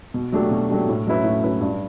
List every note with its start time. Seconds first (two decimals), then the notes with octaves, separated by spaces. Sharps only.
0.14 B2
0.32 F#3 A3 D4 G4
0.51 B2
0.70 F#3 A3 D4 G4
0.89 A2
1.07 F#3 C#4 E4 B4
1.24 A2
1.43 F#3 C#4 E4 B4
1.61 G2